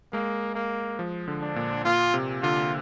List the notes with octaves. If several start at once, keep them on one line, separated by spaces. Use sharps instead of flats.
G#3 A#3
A#3
F3
D3
D4
A#2
A#2 F4
C3
D3 F4